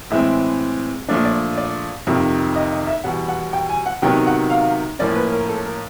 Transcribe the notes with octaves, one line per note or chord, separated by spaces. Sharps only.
A2 E3 G#3 C4 E5
A#2 F3 A3 D4 D5
D5
D5
F2 C3 D#3
D#5
D#5
E5
E2 B2 G3 F#5
F#5
G5
G#5
F#5
C3 D#3 F#3 B3 G5
F#5
F5
A2 F3 A#3 C#4 D5
B4
A#4
A4
A#4